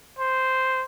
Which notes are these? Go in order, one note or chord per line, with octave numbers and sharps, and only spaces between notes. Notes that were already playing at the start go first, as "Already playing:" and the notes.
C5